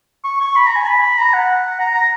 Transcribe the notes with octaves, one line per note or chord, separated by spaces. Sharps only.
C#6
C#6
B5
A#5
G#5
B5
B5
A#5
F#5
A#5
A#5